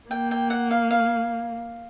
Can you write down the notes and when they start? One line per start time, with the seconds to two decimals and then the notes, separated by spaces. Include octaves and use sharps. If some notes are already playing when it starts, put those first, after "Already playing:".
0.10 A#3 G5
0.31 G5
0.50 F#5
0.71 F5
0.91 F5